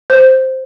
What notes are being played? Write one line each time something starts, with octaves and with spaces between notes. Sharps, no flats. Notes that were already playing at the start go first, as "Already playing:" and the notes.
C5